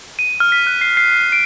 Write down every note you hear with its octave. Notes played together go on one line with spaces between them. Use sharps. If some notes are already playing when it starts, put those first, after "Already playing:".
D#7
F6
B6
F#6
C7
C7
C7
D7